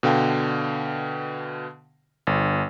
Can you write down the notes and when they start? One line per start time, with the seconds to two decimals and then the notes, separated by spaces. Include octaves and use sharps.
0.03 B2 D3 F5 G5
2.27 G1